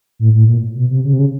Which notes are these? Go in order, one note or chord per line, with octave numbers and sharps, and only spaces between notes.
A2
A2
A#2
B2
C3
C#3
C3
C#3